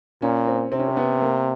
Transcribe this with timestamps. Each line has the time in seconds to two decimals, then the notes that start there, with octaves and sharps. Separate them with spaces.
0.22 A#2 C#4
0.47 C4
0.72 C3 C4
0.79 C#4
0.88 C4
0.97 B3
1.22 A#3